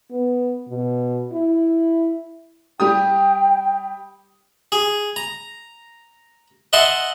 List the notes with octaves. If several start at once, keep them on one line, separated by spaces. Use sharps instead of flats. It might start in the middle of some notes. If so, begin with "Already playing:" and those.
B3
B2
E4
G3 G4 G5 D#6
G#4
A#5
D#5 E5 F#5 A5 C6